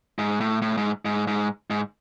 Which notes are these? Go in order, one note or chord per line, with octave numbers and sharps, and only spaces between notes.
G#2
A2
A2
G#2
G#2
G#2
G#2